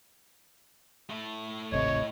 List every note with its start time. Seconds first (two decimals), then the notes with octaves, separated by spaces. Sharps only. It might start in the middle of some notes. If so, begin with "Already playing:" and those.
1.10 A2 A3
1.72 D1 G#1 C3 C#5 D#5